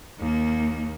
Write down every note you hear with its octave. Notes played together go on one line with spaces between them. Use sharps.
D#2 A#3